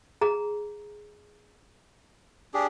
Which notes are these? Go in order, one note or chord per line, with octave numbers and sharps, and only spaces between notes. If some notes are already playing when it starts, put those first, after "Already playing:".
G#4 A#5
D4 G4 G#4